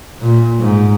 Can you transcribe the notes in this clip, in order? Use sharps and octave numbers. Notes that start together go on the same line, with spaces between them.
A#2
G#2